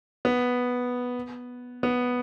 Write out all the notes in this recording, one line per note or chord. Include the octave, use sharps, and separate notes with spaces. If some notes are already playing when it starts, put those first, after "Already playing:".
B3
B3